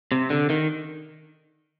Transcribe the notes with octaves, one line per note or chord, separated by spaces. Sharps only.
C3
D3
D#3